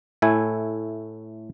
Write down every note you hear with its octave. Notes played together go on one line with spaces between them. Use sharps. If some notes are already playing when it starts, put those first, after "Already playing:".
A2 A3 E4 G#5